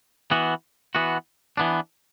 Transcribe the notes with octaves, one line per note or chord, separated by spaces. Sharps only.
E3 B3 F#4
E3 B3 F#4
E3 B3 D4